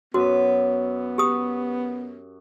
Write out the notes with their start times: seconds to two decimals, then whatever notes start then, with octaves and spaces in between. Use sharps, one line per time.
0.14 F#2 B3 F#4
1.18 G4 D#6